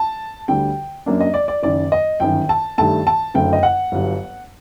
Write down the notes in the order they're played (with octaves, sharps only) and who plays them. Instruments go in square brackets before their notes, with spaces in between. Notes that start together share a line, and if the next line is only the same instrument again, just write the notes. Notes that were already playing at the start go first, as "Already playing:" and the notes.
Already playing: [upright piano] A5
D2 D3 G3 G5
F#2 F#3 A#3 D4
D#5
D5
D5
F#1 F#2 D#3 D5
D#5
G1 F#2 D#3 G5
A5
G2 D#3 A3 A5
A5
F#1 F#2 D3 F#3 A3 G5
D#5
F#5
G1 G2 F#3